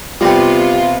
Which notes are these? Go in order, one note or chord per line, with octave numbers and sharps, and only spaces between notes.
C3 G3 B3 F4 G4